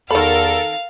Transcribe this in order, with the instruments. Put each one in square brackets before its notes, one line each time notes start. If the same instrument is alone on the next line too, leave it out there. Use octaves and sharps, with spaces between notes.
[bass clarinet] E2 [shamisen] D#3 B5 [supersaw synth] A4 A#4 [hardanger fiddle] F5